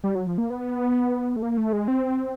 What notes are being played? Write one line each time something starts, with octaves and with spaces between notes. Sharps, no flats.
G3
F#3
F3
A#3
B3
A3
A#3
A3
G#3
C4